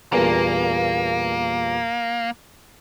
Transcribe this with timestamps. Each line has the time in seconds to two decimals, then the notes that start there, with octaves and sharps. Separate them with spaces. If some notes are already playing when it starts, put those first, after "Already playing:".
0.13 E2 G2 A#2 A#3